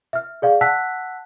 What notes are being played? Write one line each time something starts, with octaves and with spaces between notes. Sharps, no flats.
E5 F6
G#4 D5 F5
F#5 A5 E6 F#6 B6